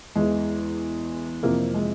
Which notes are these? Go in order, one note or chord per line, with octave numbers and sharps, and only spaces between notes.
E2 E3 G#3
F2 C3 E3 A#3
G#3